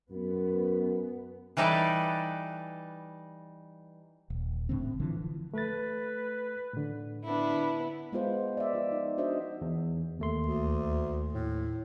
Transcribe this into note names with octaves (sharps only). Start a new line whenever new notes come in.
F#2 B3
E3 G3 D#4 A4 B4 D5
D#1
F1 A2 D3 C4
D3 E3 F3
A3 B4 A6
A2 D3
B3 D4 E4
G#3 B3 F4 C5
D5 E5
F3 F4
D#4
D4 F#4 C5 D#5 E5
E2
D#2 A3 C6
D2
A2